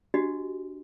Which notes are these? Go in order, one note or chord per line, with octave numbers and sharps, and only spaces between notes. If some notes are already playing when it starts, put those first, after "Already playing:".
D4 F#4 G4 D#5